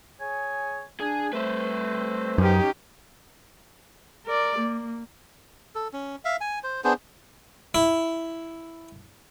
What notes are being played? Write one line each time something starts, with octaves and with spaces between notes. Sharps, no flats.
G#4 C#5 G#5
D4 G#4 G#5
G3 A3 C4 B4 C5
F#2 C#4 D#4 G4
A#4 D5
A#3
A4
C#4
E5 F5
G#5
C5
B3 D4 G#4 C5
E4